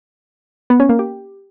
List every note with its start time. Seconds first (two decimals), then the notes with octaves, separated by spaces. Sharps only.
0.70 B3
0.80 C#4
0.89 A#3
0.99 G4